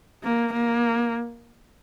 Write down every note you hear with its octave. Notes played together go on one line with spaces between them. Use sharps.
A#3
A#3